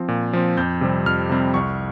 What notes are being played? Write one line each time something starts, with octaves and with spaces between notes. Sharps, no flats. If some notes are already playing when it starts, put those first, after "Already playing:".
Already playing: F3 C4
A#2
F3 C4
F2 G6
C3 G3 C4
F2 F6
C3 G3 C4
C2 C#6